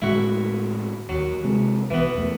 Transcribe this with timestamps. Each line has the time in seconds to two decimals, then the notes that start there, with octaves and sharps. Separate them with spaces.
0.02 A2 D3 G#3 E4 F#4
1.09 D#2 F#3
1.44 C3 G#3
1.90 B1 E3 B3
2.14 E2 A3